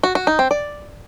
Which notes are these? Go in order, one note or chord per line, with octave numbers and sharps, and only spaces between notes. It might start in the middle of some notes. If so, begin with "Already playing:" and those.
F#4
F#4
D#4
C4
D5